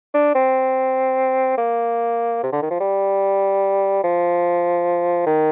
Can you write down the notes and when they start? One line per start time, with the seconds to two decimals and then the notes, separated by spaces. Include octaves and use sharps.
0.14 D4
0.35 C4
1.58 A#3
2.43 C3
2.52 D3
2.62 D#3
2.70 F3
2.80 G3
4.03 F3
5.27 D#3